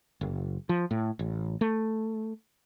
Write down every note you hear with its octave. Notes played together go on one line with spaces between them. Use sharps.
F#1
F3
A2
A1
A3